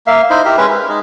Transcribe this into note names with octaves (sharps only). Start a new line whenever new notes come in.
A#3 E5 F5
D#4 E4 C5
G4 A#4 E5
G#3 C#4 B4
A#4
G#3 D#4